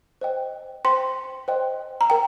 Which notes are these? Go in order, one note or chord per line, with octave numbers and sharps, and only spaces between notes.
C5 D#5 G5
C5 G5 C6
C5 D#5 G5
A#5
A#4 G5